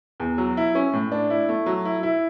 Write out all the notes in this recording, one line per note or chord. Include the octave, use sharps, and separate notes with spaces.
E2
F#3
E4
C#4
A2
D4
E4
A3
F#3
E4
E4